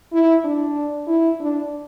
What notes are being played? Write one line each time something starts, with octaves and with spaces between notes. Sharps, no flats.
E4
D4
E4
D4